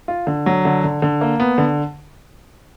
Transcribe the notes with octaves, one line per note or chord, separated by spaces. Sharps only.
F4
D3
F#3
D3
D3
D3
A#3
B3
D3